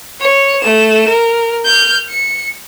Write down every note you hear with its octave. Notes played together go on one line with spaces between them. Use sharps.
C#5
A3 E7
A#4
F6 G6
C#7